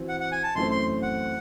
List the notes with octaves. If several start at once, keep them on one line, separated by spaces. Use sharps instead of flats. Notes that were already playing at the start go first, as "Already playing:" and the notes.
Already playing: E3 C4 F#4
F#5
F#5
G#5
A5
F#2 E3 A3 C4 C6
C6
F#5